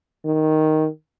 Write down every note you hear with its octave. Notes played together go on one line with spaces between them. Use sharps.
D#3